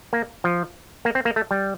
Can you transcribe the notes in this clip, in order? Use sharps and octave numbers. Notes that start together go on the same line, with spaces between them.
A#3
F3
A#3
C4
A#3
A3
G3